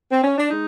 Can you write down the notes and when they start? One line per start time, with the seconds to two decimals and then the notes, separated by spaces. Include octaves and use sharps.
0.11 C4
0.24 C#4
0.38 D4
0.49 G#3 D#4